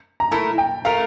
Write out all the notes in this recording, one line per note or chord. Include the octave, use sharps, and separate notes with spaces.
A#5
A3 E4 A#4 A5
G5
A3 E4 A#4 F5